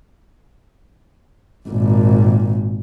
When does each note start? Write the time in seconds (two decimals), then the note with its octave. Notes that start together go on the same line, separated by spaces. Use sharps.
1.68 G#1 A#2